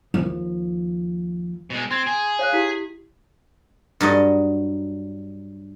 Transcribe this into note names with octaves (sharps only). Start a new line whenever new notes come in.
D#2 F3
B2 G#3
C4 C6 G#6 F7
G#4
C#5 F5 F#6
E4 G4 B6
G2 F#3 D5 D#5